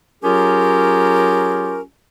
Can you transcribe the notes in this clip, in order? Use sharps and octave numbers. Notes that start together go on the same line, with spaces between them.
F#3 C#4 F4 G4 G#4 A#4